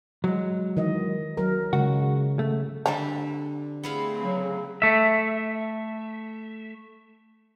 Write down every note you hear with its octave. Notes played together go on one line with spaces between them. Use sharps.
F#3 G#3
D#3 E3 D#5
F#3 A#4
C#3 G#3 F#4
A3
D3 G3 C4 A#5
A3 B3 C4 E4 G#4 F5
C#3 F#3
A3 E5